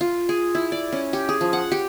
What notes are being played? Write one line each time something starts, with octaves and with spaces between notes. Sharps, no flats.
F4
G#4
E4
D5
C#4
G4
G#4
F3
F#5
G4